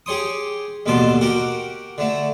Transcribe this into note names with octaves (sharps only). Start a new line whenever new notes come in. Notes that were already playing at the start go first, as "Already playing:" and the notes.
G4 G#4 C#5 C6 D#6
A1 D#2 B2 D3 A4 C6
F#4 G4 A#4
D3 A3